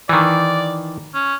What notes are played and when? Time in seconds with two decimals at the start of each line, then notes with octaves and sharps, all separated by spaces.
0.09 D#3 E3 D5
1.14 C#4